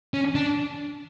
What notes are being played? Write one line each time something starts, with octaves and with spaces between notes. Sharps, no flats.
C#4
D4